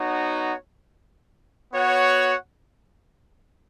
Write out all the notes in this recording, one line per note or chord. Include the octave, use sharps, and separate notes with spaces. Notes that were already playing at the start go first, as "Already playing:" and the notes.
Already playing: B3 D#4 F#4 C#5
B3 F#4 C#5 F#5